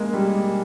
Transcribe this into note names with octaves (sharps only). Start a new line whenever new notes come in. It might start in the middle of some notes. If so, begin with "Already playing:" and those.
Already playing: G#3 A#3
G3